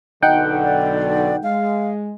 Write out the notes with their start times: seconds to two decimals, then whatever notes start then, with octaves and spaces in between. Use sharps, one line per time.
0.23 B1 B2 D3 D#4 F#5 G5
0.64 D5
1.43 G#3 F5